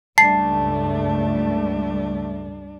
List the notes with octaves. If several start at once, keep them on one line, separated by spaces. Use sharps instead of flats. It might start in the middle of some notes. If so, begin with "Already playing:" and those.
C#2 G2 G3 A3 D4 A5 C7